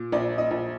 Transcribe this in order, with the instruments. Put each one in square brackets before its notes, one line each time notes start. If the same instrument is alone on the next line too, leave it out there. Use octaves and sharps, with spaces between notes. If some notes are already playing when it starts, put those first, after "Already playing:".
Already playing: [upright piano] A#2
A#1 D5
D#5
A#1